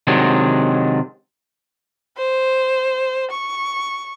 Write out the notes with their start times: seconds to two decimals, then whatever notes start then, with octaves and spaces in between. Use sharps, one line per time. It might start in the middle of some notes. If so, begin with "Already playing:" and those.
0.07 C3 D#3 F#3 G#3 D4
2.18 C5
3.31 C#6